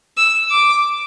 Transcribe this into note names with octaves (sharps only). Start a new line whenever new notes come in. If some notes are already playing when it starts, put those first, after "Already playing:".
E6
D6